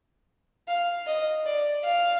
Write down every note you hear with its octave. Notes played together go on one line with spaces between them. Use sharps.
F5
D#5
D5
F5